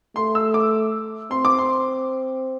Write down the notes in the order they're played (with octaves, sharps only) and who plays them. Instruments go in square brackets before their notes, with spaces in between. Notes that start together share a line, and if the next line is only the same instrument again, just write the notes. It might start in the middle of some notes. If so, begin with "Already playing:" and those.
[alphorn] A3 [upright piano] C6
[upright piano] E6
D6
[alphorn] C4 [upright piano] C6
[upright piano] D6
C6